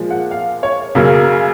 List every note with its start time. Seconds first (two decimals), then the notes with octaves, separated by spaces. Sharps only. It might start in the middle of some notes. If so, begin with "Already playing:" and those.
Already playing: A#2 F3 G#3
0.10 F#5
0.31 F5
0.63 C#5
0.95 F#2 C#3 F#3 A#3